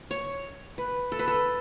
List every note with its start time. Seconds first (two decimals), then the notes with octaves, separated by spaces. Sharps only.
0.11 C#5
0.78 B4
1.12 A4
1.19 B4
1.28 A4